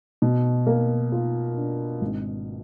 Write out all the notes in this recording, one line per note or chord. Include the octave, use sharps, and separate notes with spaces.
B2
A#3
F4
D4
G#1